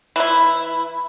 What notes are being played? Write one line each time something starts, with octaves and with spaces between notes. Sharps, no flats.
E3 E4